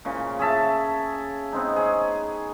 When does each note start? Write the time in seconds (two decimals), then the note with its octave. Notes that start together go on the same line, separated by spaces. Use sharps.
0.05 A#2 C#3
0.39 G#4 C#5 E5 A5
1.52 B3 C4 D#4
1.76 G#4 C#5